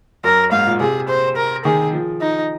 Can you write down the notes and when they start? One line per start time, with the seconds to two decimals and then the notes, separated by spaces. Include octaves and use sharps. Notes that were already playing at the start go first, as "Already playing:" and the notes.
0.24 F#2 A#4
0.52 G#2 F5
0.67 A#2
0.80 C3 G#4
1.08 C5
1.37 A#4
1.65 D#3 G#4
1.93 F3
2.21 D#4